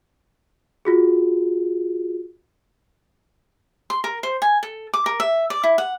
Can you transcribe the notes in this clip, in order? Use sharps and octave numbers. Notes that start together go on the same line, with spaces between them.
F4 F#4 G#4
C6
A#4
C5
G#5
A4
D6
A#4
E5
D5
E4
F#5